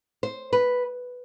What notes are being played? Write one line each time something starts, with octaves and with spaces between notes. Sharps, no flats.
C5
B4